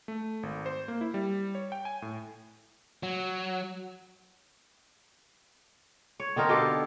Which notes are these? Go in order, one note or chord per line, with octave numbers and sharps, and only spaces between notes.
A3
G#1
C5
A#3
E4
G3
C#5
G5
G#5
A2
F#3
C#5
D3 C4 D#4 A#4
B2 G4 A4 F5